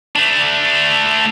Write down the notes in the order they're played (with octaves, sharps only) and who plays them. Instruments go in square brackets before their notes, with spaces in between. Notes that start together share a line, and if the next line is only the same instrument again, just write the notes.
[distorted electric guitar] A3 D4